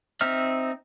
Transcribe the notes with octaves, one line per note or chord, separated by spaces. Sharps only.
C4 D#4 E5 F6